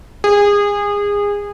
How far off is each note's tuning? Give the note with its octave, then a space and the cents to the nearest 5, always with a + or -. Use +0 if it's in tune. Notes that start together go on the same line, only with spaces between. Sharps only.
G#4 -25